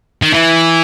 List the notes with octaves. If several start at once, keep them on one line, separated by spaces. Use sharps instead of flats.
D#3
E3